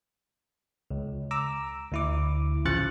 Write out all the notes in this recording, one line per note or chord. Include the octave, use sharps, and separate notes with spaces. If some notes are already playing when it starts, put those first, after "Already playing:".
C#2
A#5 D6 E6
D2 E4 D6
A1 C#3 F3 F#6 A6 C#7